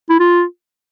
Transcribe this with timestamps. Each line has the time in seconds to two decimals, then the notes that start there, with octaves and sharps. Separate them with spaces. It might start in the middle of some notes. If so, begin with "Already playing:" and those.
0.10 E4
0.20 F4